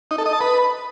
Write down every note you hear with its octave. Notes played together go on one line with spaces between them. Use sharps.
D#4
A4
D#5
A5
B4